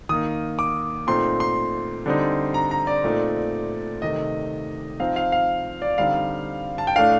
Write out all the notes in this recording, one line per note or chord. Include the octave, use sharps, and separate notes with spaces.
D#3 A#3 D#4 D#6
D6
A#2 A3 C4 D#4 C6
C6
D3 G3 C4 D#4
A#5
A#5
D5
A#2 A3 C4 D#4
C3 D#3 A3 D#5
F3 C4 D#4 F5
F5
F5
D5
D3 G3 C4 D#4 F5
A5
G5
A2 A3 D4 F5